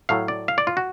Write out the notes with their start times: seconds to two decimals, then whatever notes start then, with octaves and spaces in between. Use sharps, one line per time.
0.09 A2 F#3 A3 F5
0.28 D5
0.48 F5
0.58 D5
0.67 F4
0.77 F#4